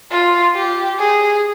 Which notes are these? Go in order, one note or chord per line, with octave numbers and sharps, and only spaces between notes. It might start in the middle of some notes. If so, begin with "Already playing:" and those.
F4
G4
G#4